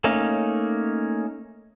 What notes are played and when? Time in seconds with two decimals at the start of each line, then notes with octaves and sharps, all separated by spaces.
0.04 A3 A#3 C#4 D#4